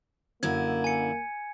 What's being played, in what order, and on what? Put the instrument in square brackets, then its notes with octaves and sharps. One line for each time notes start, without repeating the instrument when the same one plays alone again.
[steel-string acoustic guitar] F#2 D3 E4 [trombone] A#3 [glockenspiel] G#6
[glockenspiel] G#5 C#7